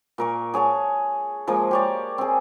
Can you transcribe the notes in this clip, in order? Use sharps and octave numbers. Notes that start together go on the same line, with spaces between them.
A#2 A#4 C#6
G#4 C#5 F#5 A5
F3 G#3 A#3
G4 C#5 D5
C4 G#4